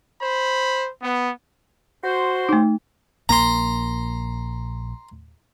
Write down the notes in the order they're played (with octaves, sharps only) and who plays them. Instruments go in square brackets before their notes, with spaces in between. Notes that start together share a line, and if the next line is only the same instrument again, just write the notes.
[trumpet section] C5 B5
B3
[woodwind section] F#4 C5 C6
[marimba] A3 D#4
[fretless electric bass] A#1 A#3 [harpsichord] A#5 C6